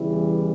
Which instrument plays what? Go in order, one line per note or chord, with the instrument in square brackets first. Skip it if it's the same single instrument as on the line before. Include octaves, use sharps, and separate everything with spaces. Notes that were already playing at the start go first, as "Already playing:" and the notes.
Already playing: [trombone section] E2 C#3 E3 G3 E4